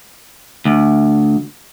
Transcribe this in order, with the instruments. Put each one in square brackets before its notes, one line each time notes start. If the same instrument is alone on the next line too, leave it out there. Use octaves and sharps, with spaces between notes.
[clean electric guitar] D2